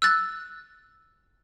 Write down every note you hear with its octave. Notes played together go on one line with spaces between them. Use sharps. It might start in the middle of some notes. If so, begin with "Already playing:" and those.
E6 F#6 A6